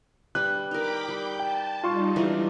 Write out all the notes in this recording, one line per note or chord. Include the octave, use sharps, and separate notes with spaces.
G3 D4 B4 F#6
D#4 A#4 G5 B5 D6
G3 G6
G5 A5
G3 D#4 F4 C6 C#6
E3 G#3 D4